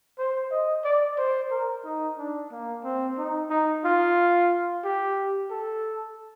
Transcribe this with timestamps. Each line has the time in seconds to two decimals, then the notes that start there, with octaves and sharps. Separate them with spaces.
0.18 C5
0.51 D#5
0.84 D5
1.18 C5
1.51 A#4
1.84 D#4
2.18 D4
2.51 A#3
2.84 C4
3.18 D#4
3.50 D#4
3.85 F4
4.84 G4
5.51 A4